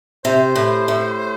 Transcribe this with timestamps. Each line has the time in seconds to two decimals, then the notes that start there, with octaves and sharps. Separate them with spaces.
0.25 C3 C5
0.56 A2
0.88 A2